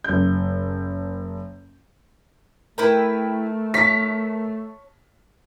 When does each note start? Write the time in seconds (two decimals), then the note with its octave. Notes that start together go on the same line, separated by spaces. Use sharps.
0.04 F#1 G6
2.78 A3 E4 A#4 B4 G5
3.74 C#5 A5 B6